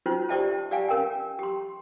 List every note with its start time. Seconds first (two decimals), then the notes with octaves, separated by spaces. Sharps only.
0.06 C#4 D#4 F4 F#4 C5
0.29 G4 C5 D5 D#5 G5 A5
0.71 G4 D5 F5 G5 G#5
0.89 C#4 A#4 G5
1.39 G4 C6